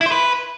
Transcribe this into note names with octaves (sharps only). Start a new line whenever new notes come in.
E4
C5
B4